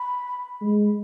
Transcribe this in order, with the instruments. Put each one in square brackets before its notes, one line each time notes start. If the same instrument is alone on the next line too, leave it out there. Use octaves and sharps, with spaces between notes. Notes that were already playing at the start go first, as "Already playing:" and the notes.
Already playing: [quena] B5
[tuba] G#3